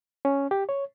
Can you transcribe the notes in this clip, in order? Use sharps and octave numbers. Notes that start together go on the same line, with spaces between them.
C#4
G4
C#5